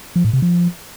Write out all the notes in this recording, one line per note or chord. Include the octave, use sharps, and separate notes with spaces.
F3
A2
C3
F3